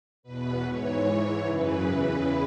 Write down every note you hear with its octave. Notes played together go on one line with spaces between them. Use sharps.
E2 B2 B4
G#2 E3 C#5
G#2 E3 C#5
F#2 C#3 E3 B4
E2 C#3 E3